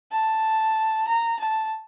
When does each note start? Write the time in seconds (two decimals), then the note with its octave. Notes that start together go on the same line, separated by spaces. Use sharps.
0.12 A5
1.08 A#5
1.39 A5